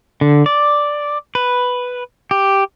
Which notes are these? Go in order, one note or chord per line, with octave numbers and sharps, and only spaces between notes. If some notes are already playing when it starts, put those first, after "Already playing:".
D3
D5
B4
G4